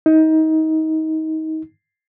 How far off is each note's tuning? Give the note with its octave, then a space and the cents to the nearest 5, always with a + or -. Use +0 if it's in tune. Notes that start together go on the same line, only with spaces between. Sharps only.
D#4 +25